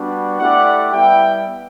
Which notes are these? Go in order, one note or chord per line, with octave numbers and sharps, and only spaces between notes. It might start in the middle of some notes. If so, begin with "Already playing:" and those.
Already playing: G3 B3 D4 F#4
A3 E4 G4 D5 F#5
G3 B3 E4 E5 G5